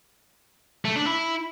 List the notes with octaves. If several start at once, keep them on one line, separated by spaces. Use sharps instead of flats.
A3
D4
E4